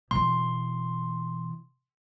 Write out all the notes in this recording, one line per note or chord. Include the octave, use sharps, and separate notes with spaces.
B2 E3 C6